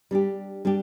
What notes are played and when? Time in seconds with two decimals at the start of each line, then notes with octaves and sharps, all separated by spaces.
0.11 G3 D4 G4
0.65 G3 D4 G4